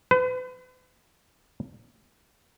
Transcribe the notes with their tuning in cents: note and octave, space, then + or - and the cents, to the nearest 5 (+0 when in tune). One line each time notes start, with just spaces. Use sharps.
B4 +40